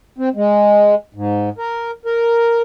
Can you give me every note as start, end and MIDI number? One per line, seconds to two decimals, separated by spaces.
0.18 0.29 60
0.36 0.95 56
1.14 1.49 44
1.58 1.91 70
2.06 2.62 70